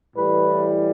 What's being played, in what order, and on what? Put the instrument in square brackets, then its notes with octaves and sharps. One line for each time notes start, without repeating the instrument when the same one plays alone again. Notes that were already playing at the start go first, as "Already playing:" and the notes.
[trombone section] A2 E3 G3 B4